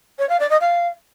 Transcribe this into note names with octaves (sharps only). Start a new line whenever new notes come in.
C#5
F5
D5
D#5
F5